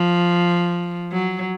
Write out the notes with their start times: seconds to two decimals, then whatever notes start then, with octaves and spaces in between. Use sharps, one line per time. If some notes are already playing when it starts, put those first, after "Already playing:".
Already playing: F3
1.12 F#3